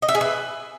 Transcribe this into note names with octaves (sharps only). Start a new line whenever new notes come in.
D#5
E5
G#4
B4